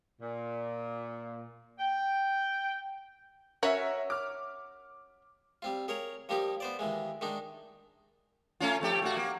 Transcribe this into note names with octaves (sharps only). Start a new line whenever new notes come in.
A#2
G5
C#4 F#4 A#4 C#5 E5
D6 F6
G3 C4 F4
G#4 A#4 C#5 A#5
F3 G3 A#3 D#4 G4
B3 C5 D5
D#2 E3 G#3
D#3 G#3 D4 D#4
A3 C#4 F4
F2 A3 G4
A#2 A3 F#4
A#3